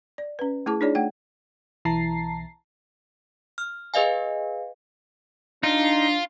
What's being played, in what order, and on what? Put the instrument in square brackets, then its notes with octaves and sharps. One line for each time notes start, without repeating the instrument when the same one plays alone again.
[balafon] D5
C#4 B4
A3 E4 G#4 A5 D6
D4 D#4 F4 G#4 C#5 D5
A3 F#5 G5
[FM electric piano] B1 E3 A5 A#5 C7
[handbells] F6
G#4 B4 D#5 F5 G#5
[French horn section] D4 [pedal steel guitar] D#4 [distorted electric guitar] F4